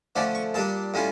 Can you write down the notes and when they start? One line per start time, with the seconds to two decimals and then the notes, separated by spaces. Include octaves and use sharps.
0.16 D3 F3 A3 C#4 D5
0.35 C#6
0.54 A#2 G3 D4 A5
0.94 A2 G3 C#4 F4